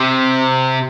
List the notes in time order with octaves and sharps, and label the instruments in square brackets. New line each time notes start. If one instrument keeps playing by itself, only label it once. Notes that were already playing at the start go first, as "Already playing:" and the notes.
Already playing: [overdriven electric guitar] C3